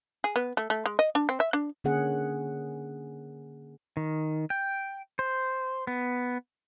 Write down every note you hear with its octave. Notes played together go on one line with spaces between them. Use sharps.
G#4
B3
A3
A3
G#3
D#5
D4
C4
E5
D4
D3 A#3 C#4 G#4 F#5
D#3
G5
C5
B3